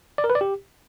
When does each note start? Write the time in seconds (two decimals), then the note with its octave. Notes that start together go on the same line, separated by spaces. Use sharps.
0.18 D5
0.24 A#4
0.30 B4
0.35 D5
0.41 G4